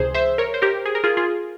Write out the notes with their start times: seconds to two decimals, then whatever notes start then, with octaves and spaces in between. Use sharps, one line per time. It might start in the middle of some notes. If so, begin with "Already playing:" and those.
Already playing: C#2 C3 E3 G#4 C5
0.14 C5 E5
0.38 A#4 C#5
0.54 C5
0.62 G4 A#4
0.86 G#4
0.95 A#4
1.04 F4 G#4
1.17 F4 G#4